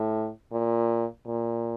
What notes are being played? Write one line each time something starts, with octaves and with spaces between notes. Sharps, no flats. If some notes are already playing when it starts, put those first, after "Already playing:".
Already playing: A2
A#2
A#2